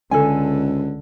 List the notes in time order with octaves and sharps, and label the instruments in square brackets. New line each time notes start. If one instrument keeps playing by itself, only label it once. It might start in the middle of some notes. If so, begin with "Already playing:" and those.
[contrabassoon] C#2 [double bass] D3 [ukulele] A4 G#5